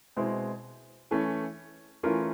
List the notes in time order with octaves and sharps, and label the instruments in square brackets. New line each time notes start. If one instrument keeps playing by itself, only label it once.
[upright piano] B2 G#3 C4 E4
E3 A3 C#4
E3 A3 C#4 F4 A#4